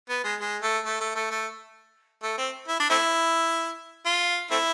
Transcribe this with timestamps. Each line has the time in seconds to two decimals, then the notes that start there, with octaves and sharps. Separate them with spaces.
0.09 B3
0.24 G#3
0.40 G#3
0.62 A3
0.85 A3
1.00 A3
1.15 A3
1.31 A3
2.23 A3
2.38 C4
2.68 E4
2.80 D4
2.90 A3 C4 E4
4.06 F4
4.51 A3 C4 E4